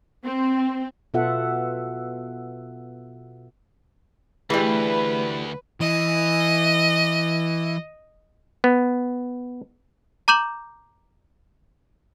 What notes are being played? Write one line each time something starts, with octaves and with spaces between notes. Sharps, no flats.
C4
B2 B3 F4 A4 E5 F#5
D2 E3 G3 A3 G#4 B4
E3 D#5
B3
A#5 D6 G6 E7 F#7